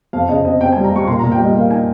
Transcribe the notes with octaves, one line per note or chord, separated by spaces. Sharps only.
F2 F5
C#3 D#5
C4 D#5
C4 G5
G#5
G3
A#5
G3 C#6
A#2 C6
A#5
A#2
G5
G3 D#5
A#3 F5
D#4 G#5